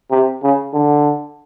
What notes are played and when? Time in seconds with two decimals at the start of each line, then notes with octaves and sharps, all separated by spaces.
0.11 C3
0.43 C#3
0.74 D3